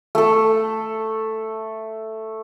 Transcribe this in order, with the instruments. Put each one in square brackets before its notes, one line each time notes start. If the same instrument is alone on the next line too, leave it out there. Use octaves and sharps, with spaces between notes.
[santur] A3 A4